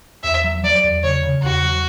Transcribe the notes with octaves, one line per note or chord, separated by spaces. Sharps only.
E2 E5
F#3
F#3 D5
E2
C#3 C#5
C#3
E2 F#4
F#3